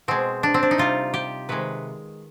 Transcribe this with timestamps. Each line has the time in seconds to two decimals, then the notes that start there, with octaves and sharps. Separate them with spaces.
0.08 B2 G#3 C4
0.43 D4
0.54 C4
0.63 D4
0.71 D#4
0.78 C3 G3 F4
1.14 G4
1.49 C3 D#3 G#3 B4